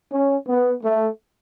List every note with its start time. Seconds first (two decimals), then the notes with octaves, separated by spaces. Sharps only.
0.12 C#4
0.48 B3
0.83 A3